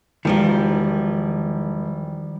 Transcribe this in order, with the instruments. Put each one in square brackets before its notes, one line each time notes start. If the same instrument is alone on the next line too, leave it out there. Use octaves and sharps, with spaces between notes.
[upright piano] E1 [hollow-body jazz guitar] D#3 F3 G3